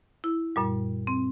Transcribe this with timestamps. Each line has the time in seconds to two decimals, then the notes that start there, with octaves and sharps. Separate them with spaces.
0.24 E4
0.56 F#2 A#2 G3
1.07 C4